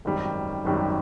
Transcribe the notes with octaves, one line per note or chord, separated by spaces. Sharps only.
G#1 F#2 D#3 G3
G#1 F#2 D#3 G3